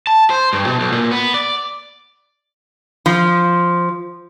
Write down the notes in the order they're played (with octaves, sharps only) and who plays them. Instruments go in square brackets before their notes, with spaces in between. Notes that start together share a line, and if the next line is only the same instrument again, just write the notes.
[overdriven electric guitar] A5
C5
G2
B2
B1
A#2
B3
D5
[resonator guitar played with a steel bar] F3